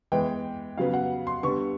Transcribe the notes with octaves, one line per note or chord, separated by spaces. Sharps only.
E3 G#3 B3 G5
C#3 F#3 B3 F5
F#5
C6
D3 G3 B3 C#6